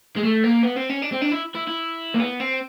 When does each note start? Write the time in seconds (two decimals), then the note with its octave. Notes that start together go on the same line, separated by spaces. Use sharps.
0.16 G#3
0.23 A3
0.44 A#3
0.63 B3
0.76 C4
0.89 C#4
1.02 D4
1.12 C4
1.22 D4
1.32 E4
1.55 E4
1.67 E4
2.14 A#3
2.20 B3
2.40 C4